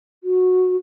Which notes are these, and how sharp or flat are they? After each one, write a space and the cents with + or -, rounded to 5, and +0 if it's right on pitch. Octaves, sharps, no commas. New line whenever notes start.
F#4 -15